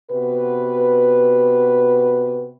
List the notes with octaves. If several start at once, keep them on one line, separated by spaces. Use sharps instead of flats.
C3 B3 F#4 B4